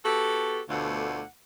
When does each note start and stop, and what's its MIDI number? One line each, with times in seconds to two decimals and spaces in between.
0.05 0.60 59
0.05 0.60 66
0.05 0.60 67
0.05 0.60 69
0.69 1.23 38
0.69 1.23 47
0.69 1.23 50
0.69 1.23 57
0.69 1.23 65
0.69 1.23 78